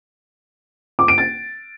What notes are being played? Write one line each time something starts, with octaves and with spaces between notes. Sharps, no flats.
D6
D7
A6